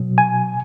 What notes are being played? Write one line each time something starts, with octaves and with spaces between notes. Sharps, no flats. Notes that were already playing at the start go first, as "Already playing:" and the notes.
Already playing: B2 F#3
G#5